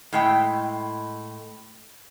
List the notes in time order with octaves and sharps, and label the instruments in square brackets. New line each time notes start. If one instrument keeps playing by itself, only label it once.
[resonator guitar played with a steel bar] A2 G#3 G5